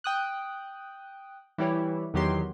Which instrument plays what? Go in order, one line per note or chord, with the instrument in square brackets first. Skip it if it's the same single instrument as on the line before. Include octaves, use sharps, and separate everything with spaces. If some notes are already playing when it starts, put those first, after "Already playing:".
[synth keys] G5 D#6 F#6
E3 G3 E4 G4 C#5
E2 D#3 F#3 G4 C6